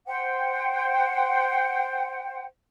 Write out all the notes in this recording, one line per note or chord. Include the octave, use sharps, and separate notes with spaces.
C5 F#5 G5